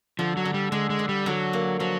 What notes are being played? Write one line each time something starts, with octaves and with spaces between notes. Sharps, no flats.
D3 F3
F#3
D3
G3
D3 G#3
G#3
D3
G3
D3 F#3
A#3
F3 F#3